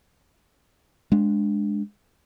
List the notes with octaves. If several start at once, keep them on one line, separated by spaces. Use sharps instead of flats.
G#3 D4